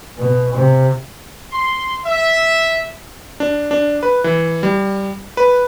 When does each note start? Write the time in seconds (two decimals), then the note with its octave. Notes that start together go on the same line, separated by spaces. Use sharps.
0.18 B2
0.54 C3
1.52 C6
2.05 E5
3.40 D4
3.71 D4
4.03 B4
4.24 E3
4.63 G3
5.37 B4